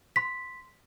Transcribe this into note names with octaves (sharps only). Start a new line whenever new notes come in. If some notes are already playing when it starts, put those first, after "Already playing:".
C6 B6